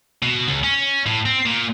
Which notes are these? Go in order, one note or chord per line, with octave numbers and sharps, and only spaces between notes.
B2
C#2
C#4
A2
C4
A#2